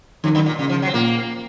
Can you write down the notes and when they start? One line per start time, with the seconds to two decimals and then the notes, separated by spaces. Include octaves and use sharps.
0.24 F2 D#3
0.35 F#2
0.46 A#2
0.58 A#2 C#3
0.69 F3
0.82 F#3
0.87 C4
0.94 A#2 A#3